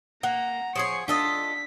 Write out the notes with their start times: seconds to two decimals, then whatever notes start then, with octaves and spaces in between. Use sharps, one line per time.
0.23 A#3 F#5 A#5
0.76 F3 G#4 C#5 C#6 C7
1.08 D4 F4 A4 D#5 B6